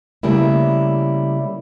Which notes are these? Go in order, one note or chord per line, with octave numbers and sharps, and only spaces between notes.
C#3 G3 A3 A#3 E4